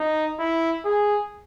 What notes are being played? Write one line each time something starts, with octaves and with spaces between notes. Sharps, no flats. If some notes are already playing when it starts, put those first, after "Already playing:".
Already playing: D#4
E4
G#4